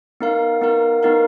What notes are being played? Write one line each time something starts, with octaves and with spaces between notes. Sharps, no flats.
B3 D#4 A#4 F5
B3 D#4 A#4 F5
B3 D#4 A#4 F5